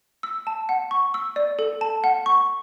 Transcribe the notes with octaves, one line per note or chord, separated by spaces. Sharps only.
E6
A5
F#5
C#6
E6
D5
A4
A5
F#5
C#6